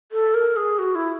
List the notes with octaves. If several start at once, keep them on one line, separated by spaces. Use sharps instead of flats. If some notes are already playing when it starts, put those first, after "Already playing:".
A4
A#4
G#4
F#4
E4